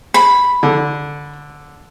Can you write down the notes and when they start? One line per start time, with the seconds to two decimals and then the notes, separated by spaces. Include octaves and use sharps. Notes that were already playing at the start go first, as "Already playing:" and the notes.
0.14 B5
0.63 D3